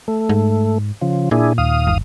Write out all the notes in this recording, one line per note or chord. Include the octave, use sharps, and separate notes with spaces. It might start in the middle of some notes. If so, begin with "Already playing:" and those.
A3
G#2
C#3 F3
A#2 D4 E4 G#4
D#2 F5 D#6
G1